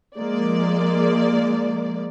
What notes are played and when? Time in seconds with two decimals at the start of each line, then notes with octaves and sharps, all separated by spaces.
0.17 F3 G#3 A#3 D5